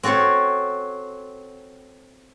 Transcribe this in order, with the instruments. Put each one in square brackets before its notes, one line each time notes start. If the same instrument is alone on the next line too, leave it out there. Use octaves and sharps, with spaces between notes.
[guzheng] C4 F#4 A4 C5 C#5